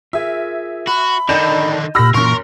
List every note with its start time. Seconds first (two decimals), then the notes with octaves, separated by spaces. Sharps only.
0.13 F4 G#4 A#4 E5
0.87 F#4 B5
1.29 D3 D#3 D4 D#5 G6 E7
1.95 A#2 G4 B5 E6 F6 A#6
2.14 F#2 A#2 E3 A#3 A#4 C6 C#6